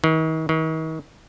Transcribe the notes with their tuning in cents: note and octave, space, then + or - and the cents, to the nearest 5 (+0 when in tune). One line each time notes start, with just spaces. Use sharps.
D#3 +40
D#3 +40